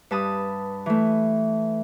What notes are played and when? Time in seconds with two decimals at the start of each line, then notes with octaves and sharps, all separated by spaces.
0.11 G2 B4 A5 D#6
0.86 E3 A3